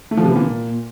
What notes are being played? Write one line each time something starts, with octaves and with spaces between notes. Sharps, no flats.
A3
F3
C3
B3
A#2